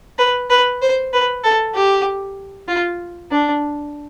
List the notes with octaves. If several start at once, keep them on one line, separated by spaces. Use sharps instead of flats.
B4
B4
C5
B4
A4
G4
F4
D4